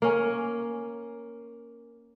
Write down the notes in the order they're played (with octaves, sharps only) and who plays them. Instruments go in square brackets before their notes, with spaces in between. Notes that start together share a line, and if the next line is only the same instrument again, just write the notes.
[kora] A#3 C#4